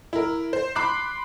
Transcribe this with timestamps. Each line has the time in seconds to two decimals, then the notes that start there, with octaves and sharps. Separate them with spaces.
0.13 E4 A#4
0.53 C5
0.75 B5 C6 D6 F#6 C7